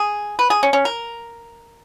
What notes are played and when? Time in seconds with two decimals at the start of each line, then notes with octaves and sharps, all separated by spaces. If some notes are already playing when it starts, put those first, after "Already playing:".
Already playing: G#4
0.39 B4
0.50 G#4
0.63 C#4
0.73 C#4
0.85 A#4